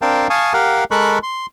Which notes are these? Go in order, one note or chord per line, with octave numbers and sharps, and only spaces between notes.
C4 D4 A#4 F5 G5 A5
F5 G#5 A5 C#6 D#6
G4 A#4 F5 F#5
G#3 A4 A#4 B5 C#6 F#6
C6